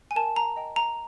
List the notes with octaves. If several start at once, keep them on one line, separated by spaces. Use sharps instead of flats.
G#5
A#4 A5
A#5
D#5 G5
A#5